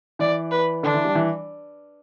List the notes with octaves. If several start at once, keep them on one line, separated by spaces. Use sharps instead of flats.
E3 D5
B4
D3 D4
E3
G3
E3